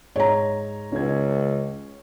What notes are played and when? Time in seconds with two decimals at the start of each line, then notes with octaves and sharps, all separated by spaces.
0.16 G#2 C#5 A#5
0.92 C#2 C#4 G#6